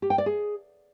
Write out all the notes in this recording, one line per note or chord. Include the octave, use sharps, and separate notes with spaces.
G4
G5
D5
G#4